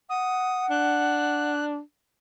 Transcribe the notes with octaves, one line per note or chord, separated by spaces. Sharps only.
F#5 D#6
D4 F#6